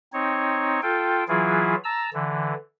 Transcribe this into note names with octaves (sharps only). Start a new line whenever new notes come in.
C4 D#4 C#5
F4 A4 G5
E3 F#3 E4 F4 G#4
A5 A#5 E6
D3 E3